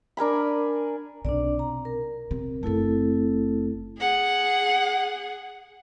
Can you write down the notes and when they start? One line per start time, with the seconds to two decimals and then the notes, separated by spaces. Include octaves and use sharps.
0.17 D4 A#4 G#5 B5
1.25 B1 C3 D4 D5
1.59 A#5
1.85 A#4
2.31 C3
2.63 F#1 A3 C4 E4 A4
3.99 G#4 F#5